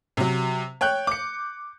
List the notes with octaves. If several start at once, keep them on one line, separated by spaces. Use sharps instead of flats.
C3 F#3
C#5 G5 F#6 G6
D6 C#7